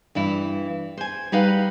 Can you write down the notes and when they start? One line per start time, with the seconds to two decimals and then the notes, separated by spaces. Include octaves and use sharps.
0.15 G2 E3 E4
0.98 C5 G#5
1.32 G3 D#4 B4 F5 F#5